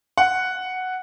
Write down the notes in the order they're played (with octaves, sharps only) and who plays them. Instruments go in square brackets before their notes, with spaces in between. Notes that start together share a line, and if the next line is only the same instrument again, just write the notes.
[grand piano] F#5